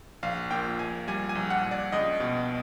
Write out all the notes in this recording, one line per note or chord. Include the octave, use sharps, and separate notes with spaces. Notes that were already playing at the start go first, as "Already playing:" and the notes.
A#1 F5
A#2 G5
A#1 G#5
G3 G#5
G#5
A#1
F#5
A#1
D5
C#2 D#5
B2